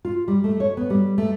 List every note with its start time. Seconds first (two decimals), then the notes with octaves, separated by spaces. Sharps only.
0.05 F4
0.28 G3
0.44 A3
0.60 C#5
0.77 B3
0.90 G3
1.18 A3